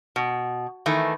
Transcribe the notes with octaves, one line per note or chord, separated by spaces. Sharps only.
B2
D#3 E3 A3